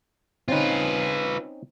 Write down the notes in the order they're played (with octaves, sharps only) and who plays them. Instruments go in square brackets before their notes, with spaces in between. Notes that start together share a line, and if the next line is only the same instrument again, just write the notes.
[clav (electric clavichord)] C4 C#4 D#4 [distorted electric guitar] F4 B4